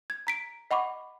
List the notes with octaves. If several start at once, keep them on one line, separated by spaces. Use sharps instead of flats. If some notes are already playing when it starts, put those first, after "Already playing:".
G#6
A#5 B6 D7
D#5 F#5 B5 C#6 D6